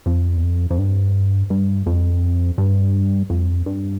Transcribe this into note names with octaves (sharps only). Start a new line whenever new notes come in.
F2
E2
F2
F2
G2
G2
F2
G2
F2
G2